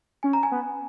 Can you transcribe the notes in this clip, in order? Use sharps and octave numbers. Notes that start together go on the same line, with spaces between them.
C#4 G#5
A#5
G#5
B3